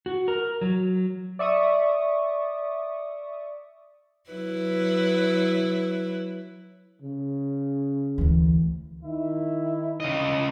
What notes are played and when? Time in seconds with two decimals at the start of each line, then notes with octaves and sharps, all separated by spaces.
0.06 F#4
0.28 A#4
0.61 F#3
1.39 D5 E5 C#6 D#6
4.30 F#3 E4 B4
7.02 C#3
8.18 D2 E3
9.03 D#3 E4
10.00 C#3 D#5